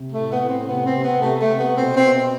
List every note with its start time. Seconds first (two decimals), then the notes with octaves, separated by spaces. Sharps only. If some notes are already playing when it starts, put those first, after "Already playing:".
Already playing: C3
0.10 A2 A3
0.29 B3
0.38 A2
0.47 C4
0.65 C3 B3
0.83 C4
0.93 C3
1.02 B3
1.21 C3 A3
1.39 A3
1.48 C3
1.58 B3
1.75 B2 C4
1.94 C4
2.03 B2